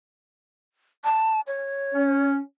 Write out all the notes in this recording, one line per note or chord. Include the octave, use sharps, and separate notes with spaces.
A5
C#5
C#4